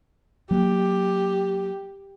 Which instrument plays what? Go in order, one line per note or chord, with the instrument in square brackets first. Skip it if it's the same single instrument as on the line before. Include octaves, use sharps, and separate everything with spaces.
[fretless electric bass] F#3 A#3 [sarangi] G4